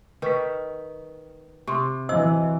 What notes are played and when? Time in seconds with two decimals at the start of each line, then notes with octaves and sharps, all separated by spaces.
0.22 D#3 B4 C#6 B6
1.68 C3 C6 C#6
2.09 E3 F#3 C5 D#5 E6